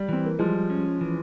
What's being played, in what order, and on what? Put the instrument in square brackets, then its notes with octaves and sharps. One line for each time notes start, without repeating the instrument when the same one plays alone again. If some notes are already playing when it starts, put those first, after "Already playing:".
Already playing: [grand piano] G3
[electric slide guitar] E3 [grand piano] C4
[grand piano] A#3
[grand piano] F3 G#3 [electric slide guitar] G3
[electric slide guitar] C#4
E3